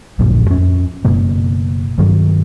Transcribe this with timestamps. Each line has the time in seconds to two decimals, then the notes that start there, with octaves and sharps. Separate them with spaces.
0.19 D1 A#1 F#2 A#2
0.50 F2 C#4
1.05 F#1 F#2 B2 A#3
1.98 G2 D#3 F#3